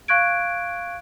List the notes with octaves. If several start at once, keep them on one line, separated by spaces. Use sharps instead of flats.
F5 C#6 F#6 G#6 D7